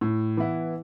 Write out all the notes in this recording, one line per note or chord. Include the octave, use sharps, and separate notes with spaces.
A2
E3 B3 E4